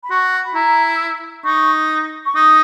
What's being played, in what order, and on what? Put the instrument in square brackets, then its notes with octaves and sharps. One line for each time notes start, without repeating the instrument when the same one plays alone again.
[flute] B5
[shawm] F#4 [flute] C#6
[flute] B5
[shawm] E4 [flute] A#5
[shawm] D#4 [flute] C#6
[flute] C#6
[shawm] D#4 [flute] D#6